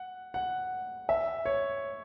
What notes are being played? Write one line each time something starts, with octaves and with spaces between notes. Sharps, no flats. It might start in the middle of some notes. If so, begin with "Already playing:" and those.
Already playing: F#5
F#5
E5
C#5